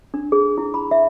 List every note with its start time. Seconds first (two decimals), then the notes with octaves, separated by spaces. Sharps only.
0.14 D4
0.32 G#4
0.58 E4
0.74 B5
0.91 E5